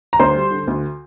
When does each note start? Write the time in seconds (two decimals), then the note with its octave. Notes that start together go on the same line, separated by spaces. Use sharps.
0.13 A#5
0.19 D2 C5 C6
0.35 G3
0.51 D3
0.67 D2